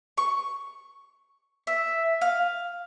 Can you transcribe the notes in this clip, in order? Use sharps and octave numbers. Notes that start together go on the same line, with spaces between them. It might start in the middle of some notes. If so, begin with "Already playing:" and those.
C#6
E5
F5